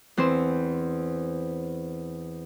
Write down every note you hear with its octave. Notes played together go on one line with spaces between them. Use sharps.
E2 C4 C5